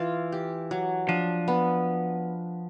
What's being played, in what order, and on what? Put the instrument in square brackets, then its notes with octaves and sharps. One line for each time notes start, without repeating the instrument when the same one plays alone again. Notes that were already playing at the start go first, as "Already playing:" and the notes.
Already playing: [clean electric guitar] E3 [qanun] F4
[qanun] G4
F#3
[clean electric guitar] F3 [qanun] D4
[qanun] B3